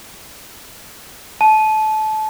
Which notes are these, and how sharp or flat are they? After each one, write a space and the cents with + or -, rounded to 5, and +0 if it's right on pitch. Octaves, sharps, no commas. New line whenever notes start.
A5 -25